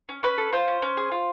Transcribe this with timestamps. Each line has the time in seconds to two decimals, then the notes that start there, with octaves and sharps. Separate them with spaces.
0.09 C#4
0.23 C#4 B4
0.38 A4
0.53 F4 C5
0.68 C#4
0.82 C#4
0.97 G#4
1.11 F4